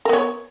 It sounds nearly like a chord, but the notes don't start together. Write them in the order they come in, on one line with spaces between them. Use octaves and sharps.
A#4 B3 C#5